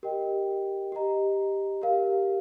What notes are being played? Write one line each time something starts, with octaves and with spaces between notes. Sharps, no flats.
G4 A#4 D#5 G5
G4 D#5 A#5
G4 A#4 F5